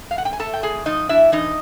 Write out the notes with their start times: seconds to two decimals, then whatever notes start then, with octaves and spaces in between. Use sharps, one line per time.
0.11 F5
0.18 F#5
0.25 G5
0.33 G#5
0.40 A3 A4 A5
0.54 G5
0.63 A2 G#4 G#5
0.86 F3 D#4 D#5
1.09 D4 E4 E5
1.32 E3 D#4 D#5